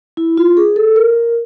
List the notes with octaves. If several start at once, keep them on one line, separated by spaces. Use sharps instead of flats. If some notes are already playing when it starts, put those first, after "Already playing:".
E4
F4
G#4
A4
A#4